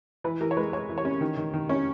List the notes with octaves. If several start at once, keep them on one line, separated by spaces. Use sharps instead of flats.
E3 B4
E3 A#4
C#5
G#3 B4
G#3 C#5
E3
C#5
C#4
D#3
D#3
D#3
C#4